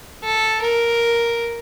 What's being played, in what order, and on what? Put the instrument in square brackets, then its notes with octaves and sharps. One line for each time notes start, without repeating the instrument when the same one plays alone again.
[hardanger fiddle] A4
A#4